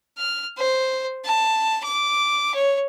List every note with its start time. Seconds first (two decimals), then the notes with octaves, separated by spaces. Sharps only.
0.18 F6
0.58 C5
1.25 A5
1.84 D6
2.55 C#5